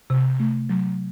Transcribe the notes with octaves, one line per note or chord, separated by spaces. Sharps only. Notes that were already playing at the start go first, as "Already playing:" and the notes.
C3
A3
F#3